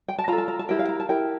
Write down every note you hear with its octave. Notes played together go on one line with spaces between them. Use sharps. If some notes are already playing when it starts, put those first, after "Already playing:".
G5
A5
F4 A4 A#5
A5
A#5
A5
E4 G4 A#4 G5
F5
A#5
A5
E4 G4 A#4 G5